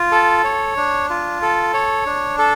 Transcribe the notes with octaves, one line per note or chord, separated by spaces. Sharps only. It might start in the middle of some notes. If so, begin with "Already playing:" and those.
Already playing: F4
A4
C#5
D4
F4
A4
C#5
D4
A4